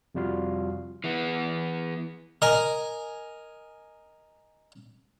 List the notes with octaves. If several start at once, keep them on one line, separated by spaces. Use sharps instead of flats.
F2 C3 G3 F4 F#4 F5
E3 B3
A#4 D#5 G#5